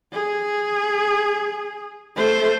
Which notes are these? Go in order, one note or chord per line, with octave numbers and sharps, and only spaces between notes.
G#4
A3 C5